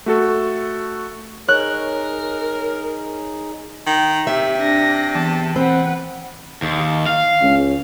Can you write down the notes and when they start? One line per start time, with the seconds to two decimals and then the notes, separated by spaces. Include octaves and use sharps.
0.06 A3 F#4 A4
1.49 D#4 G#4 A#4 C#5 F#6
3.86 D#3
4.27 C3 G4 E5
4.58 D4 A#6
5.15 E2 A5
5.56 C4 B4 F#5
6.62 D#2
7.06 F5
7.42 C#2 C#4